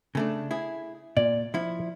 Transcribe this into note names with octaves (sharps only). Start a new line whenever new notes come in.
C#3 A3 D4
E4 G#4
A#2 D5
F3 E4